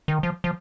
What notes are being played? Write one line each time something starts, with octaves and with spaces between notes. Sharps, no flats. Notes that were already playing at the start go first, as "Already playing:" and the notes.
D#3
F3
F3